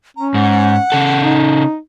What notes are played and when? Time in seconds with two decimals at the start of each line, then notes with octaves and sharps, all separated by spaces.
0.17 C#4 A#5
0.34 G#2 F#5
0.92 C#3 A4
1.20 D#4